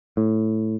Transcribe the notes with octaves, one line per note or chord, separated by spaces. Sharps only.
A2